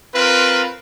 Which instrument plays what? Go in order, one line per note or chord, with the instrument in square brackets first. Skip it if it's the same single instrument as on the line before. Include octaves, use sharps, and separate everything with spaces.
[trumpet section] C4 F4 A#4 B4